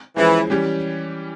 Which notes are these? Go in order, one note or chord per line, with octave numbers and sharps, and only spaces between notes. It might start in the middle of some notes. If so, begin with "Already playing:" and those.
E3 F3 G#3 C#4 E4 G#4
E3 G3 C#4 G4